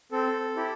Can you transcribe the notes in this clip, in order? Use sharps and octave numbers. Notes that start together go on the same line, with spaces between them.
C4 A4
E4 G4